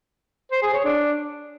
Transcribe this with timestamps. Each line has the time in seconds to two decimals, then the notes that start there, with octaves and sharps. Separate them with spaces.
0.51 C5
0.63 G#4
0.74 C#5
0.85 D4